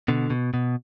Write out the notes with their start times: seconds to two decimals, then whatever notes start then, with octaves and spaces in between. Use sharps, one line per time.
0.08 B2 D3
0.30 B2
0.54 B2